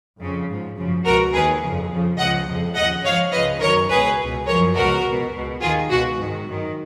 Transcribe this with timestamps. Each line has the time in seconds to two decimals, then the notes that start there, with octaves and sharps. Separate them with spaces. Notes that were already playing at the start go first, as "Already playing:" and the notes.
0.20 F2 C#3 F3
0.48 G#2 F3
0.76 F#2 C#3 F3
1.05 C#2 B2 F#4 A#4
1.33 D#2 D#3 G#4 B4
1.62 F2 C#3 F3
1.90 F2 C#3 F3
2.18 C#2 C#3 F3 D#5 F#5
2.47 F2 C#3 F3
2.76 D#2 C#3 F3 D#5 F#5
3.04 G#2 F3 C#5 F5
3.32 C#2 C#3 F3 B4 D#5
3.61 F#2 D#3 A#4 C#5
3.89 C#2 B2 G#4 B4
4.18 C#2
4.23 B2
4.47 F3 A#4 C#5
4.51 F#2
4.75 C#2 B2 F#4 A#4
5.04 C#2 B2
5.32 C#2 B2
5.61 D#2 D#3 F4 G#4
5.90 C#2 B2 F#4
6.18 G#2 D#3
6.46 F#2 D#3